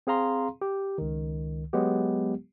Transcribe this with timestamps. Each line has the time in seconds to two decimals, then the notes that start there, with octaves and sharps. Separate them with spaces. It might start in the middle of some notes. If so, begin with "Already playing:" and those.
0.07 C4 G#4 F5 A#5 C6
0.62 G4
0.98 C#2 D#3
1.73 F#3 G#3 B3 G4